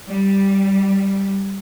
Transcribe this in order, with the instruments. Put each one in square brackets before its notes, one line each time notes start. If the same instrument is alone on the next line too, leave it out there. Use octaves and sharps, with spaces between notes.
[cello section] G3